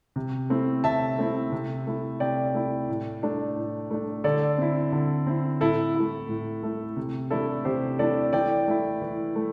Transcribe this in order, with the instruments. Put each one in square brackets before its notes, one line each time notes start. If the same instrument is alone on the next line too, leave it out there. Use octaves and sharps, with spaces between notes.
[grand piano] C3
A3 C4 E4
C3 E5 A5
A3 C4 E4
C3
A3 E4
C3 D5 G5
A3 E4
A2
A3 D4
A2
A3 D4
D3 A4 D5
C4 E4
D3
C4 E4
A2 E4 A4
A3 E4
A2
A3 E4
C3
E3 A3 D4 E4 A4
C3 G4 C5
E3 A3 D4 A4 D5
E3 D5 G5
A3 E4
E3
A3